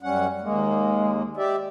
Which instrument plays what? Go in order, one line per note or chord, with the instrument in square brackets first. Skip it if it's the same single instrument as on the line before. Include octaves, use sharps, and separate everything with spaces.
[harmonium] F#2 G3 F#5 [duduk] C#4
[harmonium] D#2 A#3 [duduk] G#3
[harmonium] G4 D5 E5